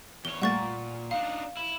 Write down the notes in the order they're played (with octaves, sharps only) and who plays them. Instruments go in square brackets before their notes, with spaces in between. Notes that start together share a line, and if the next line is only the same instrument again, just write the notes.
[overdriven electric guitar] E2 C#5 [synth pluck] C#6 [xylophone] G7
[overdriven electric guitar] A#2 [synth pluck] G3 A3 A#3 [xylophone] F#5 C#6 A6
[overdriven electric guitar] D4 D#4 [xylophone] F5
[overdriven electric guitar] E4